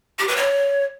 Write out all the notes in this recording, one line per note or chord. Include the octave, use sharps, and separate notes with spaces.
G4
B4
C#5